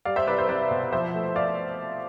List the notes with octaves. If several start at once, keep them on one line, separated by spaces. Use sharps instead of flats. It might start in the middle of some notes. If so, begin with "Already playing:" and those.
G3 D5 F5
C5 E5
C2 B4 D5
C5
C2 B4 D5
B2
F3 C5 E5
A3
D5 F5